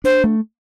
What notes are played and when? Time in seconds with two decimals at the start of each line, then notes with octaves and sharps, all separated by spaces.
0.04 D4 C5
0.24 A3